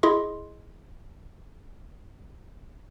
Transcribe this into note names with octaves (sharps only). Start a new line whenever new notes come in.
E4 G#4 D#5 C6